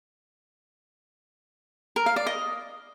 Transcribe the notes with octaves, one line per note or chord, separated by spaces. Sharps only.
A#4
F5
D5
D#5